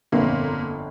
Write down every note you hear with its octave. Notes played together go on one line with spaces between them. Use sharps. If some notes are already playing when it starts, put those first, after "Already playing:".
G1 F2 A#2 D3 A#3